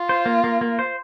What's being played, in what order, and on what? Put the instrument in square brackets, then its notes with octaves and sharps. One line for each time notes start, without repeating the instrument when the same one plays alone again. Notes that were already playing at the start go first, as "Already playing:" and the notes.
Already playing: [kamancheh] F4
[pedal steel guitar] C5
A#3
A#3
A#3
C5